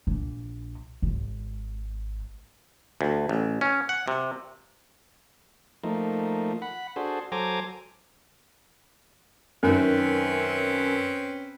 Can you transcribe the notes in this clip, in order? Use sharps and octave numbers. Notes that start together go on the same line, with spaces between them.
A#1
G#1
D2
A1
C#4
F#5
C3
F3 A3 A#3 D#4
F#5 B5
D4 F#4 G#4 A4 C5
F#3 A4 C5 G#5 A#5 D6
F#2 D#3 C4 C#4 B4